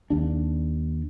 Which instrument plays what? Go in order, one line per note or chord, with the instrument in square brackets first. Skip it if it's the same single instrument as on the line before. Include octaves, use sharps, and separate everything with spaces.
[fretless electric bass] D#2 D4